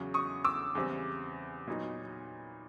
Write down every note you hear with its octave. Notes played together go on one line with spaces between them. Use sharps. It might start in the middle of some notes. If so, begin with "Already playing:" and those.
Already playing: E2 C#3 F#3
C#6 D#6
D6 E6
E2 C#3 E3 G3 C4
A#2 F#3 B3 D#4